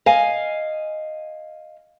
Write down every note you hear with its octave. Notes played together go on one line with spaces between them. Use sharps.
D#5 F5 G#5